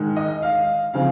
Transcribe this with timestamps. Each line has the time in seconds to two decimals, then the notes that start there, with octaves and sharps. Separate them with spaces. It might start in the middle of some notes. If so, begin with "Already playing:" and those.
Already playing: G#2 D#3 G#3
0.16 D#5
0.42 F5
0.94 C#3 F3 C4 F5